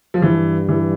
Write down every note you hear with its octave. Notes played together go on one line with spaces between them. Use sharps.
F3
G2 E3
E3